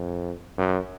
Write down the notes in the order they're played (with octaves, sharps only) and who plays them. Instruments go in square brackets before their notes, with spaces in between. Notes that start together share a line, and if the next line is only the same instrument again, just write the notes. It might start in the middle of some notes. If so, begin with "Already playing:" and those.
Already playing: [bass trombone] F2
F#2